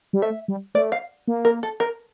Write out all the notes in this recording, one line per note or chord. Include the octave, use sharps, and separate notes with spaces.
G3
A3 E5
G3
A3 D5
F5
A#3
A#4
A4
A#4